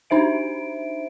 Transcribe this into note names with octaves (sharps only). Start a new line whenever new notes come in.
D4 D#4 C5 E5 D7